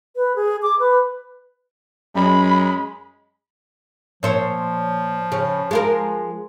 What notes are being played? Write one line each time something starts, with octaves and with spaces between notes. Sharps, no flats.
B4
G#4
D6
B4
F#2 G#3 B5
A#2 F3 C5 C#5
C#3
G#3 F4 A#4